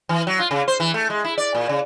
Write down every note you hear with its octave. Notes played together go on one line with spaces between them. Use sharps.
E3
F#3
F4
C#3
C5
E3
A3
G#3
E4
D5
A#2
C#3